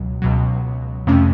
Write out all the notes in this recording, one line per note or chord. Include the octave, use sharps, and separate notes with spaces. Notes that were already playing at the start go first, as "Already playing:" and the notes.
Already playing: C#2 B2 F#3
C#2 B2 F#3
F2 C3 F3 A3 C#4